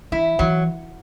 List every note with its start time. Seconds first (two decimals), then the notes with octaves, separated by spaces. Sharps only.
0.12 E3 E4
0.39 E3 F#3